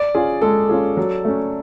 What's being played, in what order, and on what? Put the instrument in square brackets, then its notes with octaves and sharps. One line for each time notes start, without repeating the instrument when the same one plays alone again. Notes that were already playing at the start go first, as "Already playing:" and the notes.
Already playing: [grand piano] D5
[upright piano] C#4 F4 G#4
[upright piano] G#3 [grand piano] A4
[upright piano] C#4 F4 G#4
F#3
A3 C#4